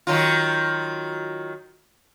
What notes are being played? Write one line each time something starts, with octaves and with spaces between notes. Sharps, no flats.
D#3 F#3 F4